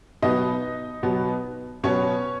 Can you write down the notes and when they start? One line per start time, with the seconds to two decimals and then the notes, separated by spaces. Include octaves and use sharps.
0.22 B2 F#3 B3 D#4 D#5
1.03 B2 F#3 B3
1.84 B2 F#3 B3 C#4 C#5